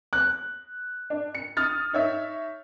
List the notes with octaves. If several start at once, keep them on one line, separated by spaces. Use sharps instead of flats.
F#6
D4
C#7
D#6 F6 A6
D#4 C#5 E5